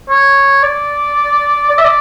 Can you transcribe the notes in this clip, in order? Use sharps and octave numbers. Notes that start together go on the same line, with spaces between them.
C#5
D5
D5
E5
D5